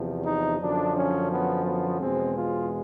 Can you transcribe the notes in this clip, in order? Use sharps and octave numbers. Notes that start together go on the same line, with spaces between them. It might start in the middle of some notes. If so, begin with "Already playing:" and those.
Already playing: E2 C3 F3
D#4
F#2 D3 F3 D4
C#4
B3
B3
E2 B2 G#3 C4
F4